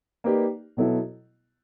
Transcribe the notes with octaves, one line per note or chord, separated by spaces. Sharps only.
A#3 D#4 G4 B4 D5
B2 F#3 B3 E4 A4